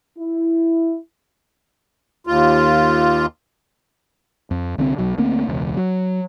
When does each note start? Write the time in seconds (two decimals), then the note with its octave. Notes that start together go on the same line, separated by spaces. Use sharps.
0.18 E4
2.27 D#2 F4
4.51 F2
4.78 C2 D3 C4
4.98 B1 F#3
5.18 D2 A3 A#3 C4
5.47 E1 C#2
5.77 F#3